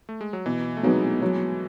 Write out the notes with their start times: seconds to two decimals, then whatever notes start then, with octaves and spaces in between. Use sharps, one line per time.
0.09 A3
0.21 G#3
0.33 F#3
0.46 B2 E3
0.77 A3
0.83 F#3 G#3 B3 D#4
1.22 F#3